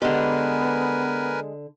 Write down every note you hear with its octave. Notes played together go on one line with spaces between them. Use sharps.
D3 G#3 B3 G4 A#4 B4 G#5